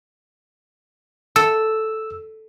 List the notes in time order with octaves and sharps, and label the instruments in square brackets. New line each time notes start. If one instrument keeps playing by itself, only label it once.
[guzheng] A4 [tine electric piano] E6